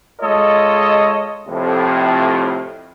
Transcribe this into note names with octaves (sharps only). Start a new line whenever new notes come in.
G#3 F4 A4 C#5 D#5
F2 A2 C3